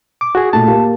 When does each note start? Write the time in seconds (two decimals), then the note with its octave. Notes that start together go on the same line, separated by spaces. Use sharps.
0.21 D6
0.35 F#4 G#4
0.53 A#2 A3 A5
0.67 A#3 G4